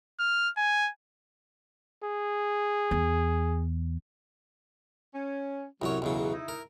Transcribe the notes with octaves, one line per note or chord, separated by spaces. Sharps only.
F6
G#5
G#4
E2
C#4
C2 F#2 F#3 C#5
B1 E2 C#3
D#4 E4
A#4